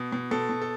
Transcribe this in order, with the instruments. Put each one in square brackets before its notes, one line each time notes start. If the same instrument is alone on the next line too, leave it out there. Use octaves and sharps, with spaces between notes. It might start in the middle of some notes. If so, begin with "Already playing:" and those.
Already playing: [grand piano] B2
B2
B2 A4
B2
A4